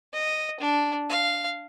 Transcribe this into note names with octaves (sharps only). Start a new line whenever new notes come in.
D#5
D4
F5